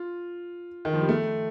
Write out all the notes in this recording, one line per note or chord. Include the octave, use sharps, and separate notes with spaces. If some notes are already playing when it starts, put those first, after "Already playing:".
Already playing: F4
D#3
F3
G3
A3